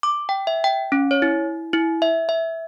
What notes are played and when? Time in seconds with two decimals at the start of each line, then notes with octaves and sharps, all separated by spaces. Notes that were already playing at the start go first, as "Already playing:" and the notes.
0.03 D6
0.29 G5
0.47 E5
0.64 G5
0.92 C#4
1.11 C#5
1.22 E4
1.73 E4
2.02 E5
2.29 E5